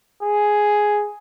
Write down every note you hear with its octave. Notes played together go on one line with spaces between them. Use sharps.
G#4